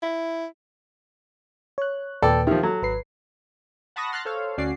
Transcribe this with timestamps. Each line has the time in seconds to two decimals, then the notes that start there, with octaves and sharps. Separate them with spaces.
0.02 E4
1.78 C#5 F#6
2.22 D#2 A#2 A4 B4 D5 G5
2.47 D#3 F3 G4 E5 F6
2.63 F#3 A4
2.82 G#1 B4 C7
3.96 F#5 A5 B5 C#6 D#6 A#6
4.12 C6 F6 F#6 A6 A#6
4.25 A4 C5 C#5 F5
4.57 D2 C#4 F#4 D5 C7